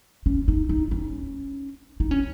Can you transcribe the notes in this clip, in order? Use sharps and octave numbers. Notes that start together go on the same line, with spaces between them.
C#4
D#4
D#4
C#4
D#4
C#4